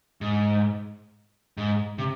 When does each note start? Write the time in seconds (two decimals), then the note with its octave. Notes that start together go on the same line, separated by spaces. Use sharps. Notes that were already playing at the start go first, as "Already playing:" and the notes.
0.21 G#2
1.57 G#2
1.98 C3